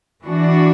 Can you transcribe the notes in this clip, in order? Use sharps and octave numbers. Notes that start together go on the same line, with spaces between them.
E3 D4 F#4